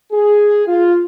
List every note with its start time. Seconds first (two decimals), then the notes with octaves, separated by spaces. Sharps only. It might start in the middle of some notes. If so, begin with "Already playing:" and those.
0.12 G#4
0.66 F4